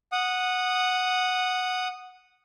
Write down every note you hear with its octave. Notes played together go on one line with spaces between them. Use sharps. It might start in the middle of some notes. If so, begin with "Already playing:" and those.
F#5 D#6